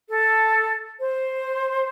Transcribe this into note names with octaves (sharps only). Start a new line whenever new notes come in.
A4
C5